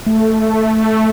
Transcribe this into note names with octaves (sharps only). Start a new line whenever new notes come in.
A3